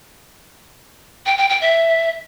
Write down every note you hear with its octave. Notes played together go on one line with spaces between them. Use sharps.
G5
G5
G5
E5